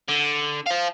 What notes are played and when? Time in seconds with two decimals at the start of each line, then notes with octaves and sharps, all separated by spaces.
0.09 D3
0.67 C5 F5